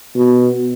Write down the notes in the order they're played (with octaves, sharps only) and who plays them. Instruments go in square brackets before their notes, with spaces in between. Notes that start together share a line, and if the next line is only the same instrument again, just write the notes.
[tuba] B2